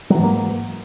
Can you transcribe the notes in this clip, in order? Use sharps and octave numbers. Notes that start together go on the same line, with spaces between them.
G#2 E3 F#3 A#3